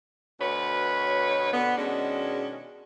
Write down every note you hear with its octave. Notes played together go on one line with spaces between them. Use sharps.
D2 B2 B4 C#5
B2 D3 B3
B2 D#3 G#3 C#4 D4